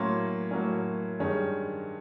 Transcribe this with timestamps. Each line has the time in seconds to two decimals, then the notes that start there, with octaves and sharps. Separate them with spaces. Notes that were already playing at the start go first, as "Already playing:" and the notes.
Already playing: A2 F#3 A#3 C#4 C6
0.51 A2 F#3 A#3 C#4
1.19 G2 D#3 G#3 C#4